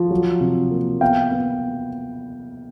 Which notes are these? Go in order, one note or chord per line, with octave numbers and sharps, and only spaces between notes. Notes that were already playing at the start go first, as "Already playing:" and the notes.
Already playing: F3
F#3
C3
A#3
B3 F5 G5
B3